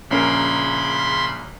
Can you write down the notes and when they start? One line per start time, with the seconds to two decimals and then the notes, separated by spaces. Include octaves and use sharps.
0.11 A#1 C#3 C#4 A#4 B5 C6